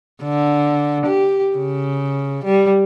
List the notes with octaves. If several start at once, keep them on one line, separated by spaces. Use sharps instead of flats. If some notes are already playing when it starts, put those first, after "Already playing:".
D3
G4
C#3
G3